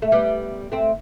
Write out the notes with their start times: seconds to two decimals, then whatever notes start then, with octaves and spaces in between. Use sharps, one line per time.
0.02 A3
0.12 G3 B3
0.72 A3 C4